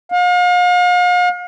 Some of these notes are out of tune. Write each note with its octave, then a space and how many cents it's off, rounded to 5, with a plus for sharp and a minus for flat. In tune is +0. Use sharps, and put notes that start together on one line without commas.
F5 +40